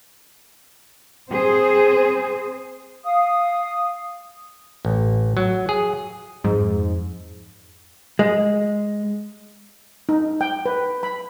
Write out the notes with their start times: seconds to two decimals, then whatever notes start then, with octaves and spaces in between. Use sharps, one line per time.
1.30 C4 G#4 C5
3.03 F5 D#6
4.85 A1
5.37 F#3
5.69 G#4
6.44 F2 G#2
8.19 G#3
10.09 D#4
10.41 G5
10.66 B4
11.03 B5